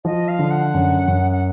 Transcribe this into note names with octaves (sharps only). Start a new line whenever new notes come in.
F3 D#5
F5
D3
F#5
F#2
F#2
F#5